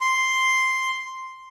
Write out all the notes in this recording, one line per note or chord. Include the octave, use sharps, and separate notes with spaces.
C6